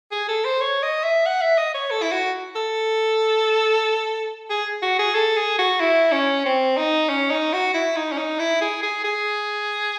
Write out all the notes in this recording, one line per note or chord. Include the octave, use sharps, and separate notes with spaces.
G#4
A4
C5
C#5
D#5
E5
F#5
E5
D#5
C#5
A4
E4
F#4
A4
G#4
F#4
G#4
A4
G#4
F#4
E4
C#4
C4
D#4
C#4
D#4
F#4
E4
D#4
C#4
D#4
E4
G#4
G#4
G#4